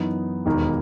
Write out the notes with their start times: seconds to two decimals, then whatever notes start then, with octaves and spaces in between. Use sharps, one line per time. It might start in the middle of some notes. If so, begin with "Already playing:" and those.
Already playing: F#2 E3 B3 D#4
0.46 E1 D#2 D#3 A#3 D#4